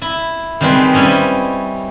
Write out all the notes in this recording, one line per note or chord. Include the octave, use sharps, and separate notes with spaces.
E4
D#3 G3 G#3 C4 B4
G3 C#4 E4 D#5